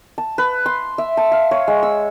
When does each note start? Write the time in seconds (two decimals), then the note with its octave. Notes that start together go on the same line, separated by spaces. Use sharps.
0.18 A5
0.38 B4
0.66 C6
0.98 E5
1.17 A5
1.32 F5
1.51 C#5
1.68 G#3
1.83 E6